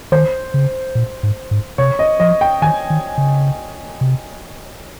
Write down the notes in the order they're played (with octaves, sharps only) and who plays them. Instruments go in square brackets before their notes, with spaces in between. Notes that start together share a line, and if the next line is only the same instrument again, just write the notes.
[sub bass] D#3 [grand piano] C5
[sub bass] C#3
A#2
G#2
G#2
[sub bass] C3 [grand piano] C#5
[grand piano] D#5
[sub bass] F3 [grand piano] D#5
[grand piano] G5
[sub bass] D#3 [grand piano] G#5
[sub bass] D#3
C#3
C3